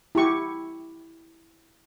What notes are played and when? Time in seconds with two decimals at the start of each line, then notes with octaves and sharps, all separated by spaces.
0.15 E4 G4 C#6